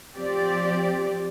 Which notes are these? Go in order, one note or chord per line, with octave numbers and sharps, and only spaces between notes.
F3 C4 G4 D5